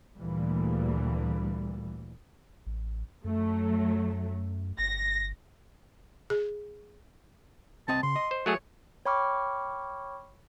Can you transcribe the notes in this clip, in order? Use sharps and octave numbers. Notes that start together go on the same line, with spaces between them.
D2 A#2 E3 G3
A1
F#2 F#3 A3
G1 A#6
G#4
C2 C4 D#5 A5
C#3 C6
D#5
C5
F#3 A3 G#4 C#5
C#5 G5 B5 C#6 D6 F6